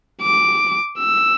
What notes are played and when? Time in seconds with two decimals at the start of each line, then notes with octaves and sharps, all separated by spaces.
0.22 D6
0.98 E6